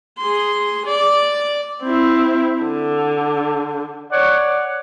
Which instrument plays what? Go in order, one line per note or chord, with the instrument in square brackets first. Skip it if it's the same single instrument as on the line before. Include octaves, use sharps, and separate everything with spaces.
[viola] G#4 C6
D5
C4 E4
D3
[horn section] C#5 D5 [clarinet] F#5